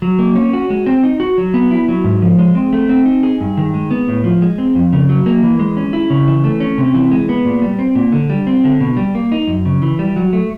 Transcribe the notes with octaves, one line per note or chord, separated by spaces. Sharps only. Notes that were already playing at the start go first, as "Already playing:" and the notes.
F#3
A#3
C#4
F#4
G#3
C4
D#4
F#4
F#3
B3
E4
F#3
G#2
F3
G#3
C4
A3
C4
D#4
G#4
G2
D#3
G#3
B3
A2
F3
G#3
C4
F2
C#3
F#3
A#3
E3
G#3
C#4
E4
C#3
E3
A3
C#4
C3
E3
G#3
B3
A#2
G3
C4
A#2
D3
G3
C4
D3
B2
G3
A#3
D#4
F#2
C#3
E3
G3
F#3
A3